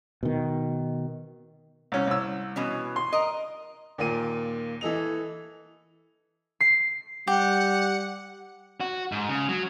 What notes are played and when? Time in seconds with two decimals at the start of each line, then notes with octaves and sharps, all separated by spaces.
0.23 B2 D#3
1.92 C2 C#4
2.07 C2 E6
2.56 B2 E3 C#4
2.96 C6
3.12 A#4 D#5
3.98 D#2 A#2 A#3 D#7
4.81 E3 A4 D#5 F7
6.61 C7
7.27 G3 G4 F#5
8.81 F#4
9.12 G#2
9.29 C#3
9.49 F#3